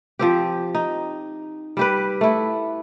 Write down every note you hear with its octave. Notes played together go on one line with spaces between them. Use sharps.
F3 C4 G4
D#4
G3 G4 B4
A3 E4